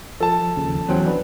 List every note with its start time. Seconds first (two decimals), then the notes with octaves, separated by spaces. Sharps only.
0.21 F3 A4 A5
0.56 D#2 C#3 F3
0.89 E2 F#3 C#4 C5 G5
1.06 D4 B4